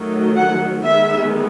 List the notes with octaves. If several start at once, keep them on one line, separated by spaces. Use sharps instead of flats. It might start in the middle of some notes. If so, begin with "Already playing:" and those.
Already playing: D#3 F#3 A3
F#5
D#3 G#3 B3 E5